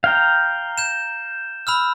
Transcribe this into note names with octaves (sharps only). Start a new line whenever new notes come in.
F5 G5 A#5
G6 E7
B5 E6 F6